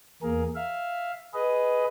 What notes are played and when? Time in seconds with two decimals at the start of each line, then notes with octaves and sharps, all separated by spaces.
0.22 E2 A#3 G#4 A#4
0.55 E5 F5
1.34 G#4 B4 D#5